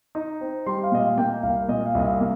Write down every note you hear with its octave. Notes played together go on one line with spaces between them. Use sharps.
D#4
C4
G3 C6
F5
A#2 D#5
F5
A#3 G5
C2 F5
A#2 D#5
F5
C2 D#5
F5
A#3